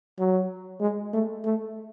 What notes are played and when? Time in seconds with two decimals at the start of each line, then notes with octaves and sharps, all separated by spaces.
0.19 F#3
0.80 G#3
1.13 A3
1.44 A3